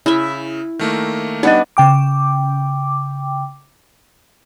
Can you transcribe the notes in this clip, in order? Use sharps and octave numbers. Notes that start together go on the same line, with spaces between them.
C#3 E4 E5
D#3 A3 A#3
G3 B3 D4 D#4 D#5 F#5 D#7
C#3 G5 D6